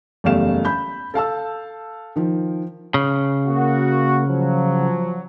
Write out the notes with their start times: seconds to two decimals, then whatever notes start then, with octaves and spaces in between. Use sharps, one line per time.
0.24 F#1 E2 G3 A3 F5 E7
0.65 B5 G6
1.14 A4 F5 A5 E6
2.16 D#3 F3
2.94 C#3
3.46 A#3 F#4
4.26 F3 F#3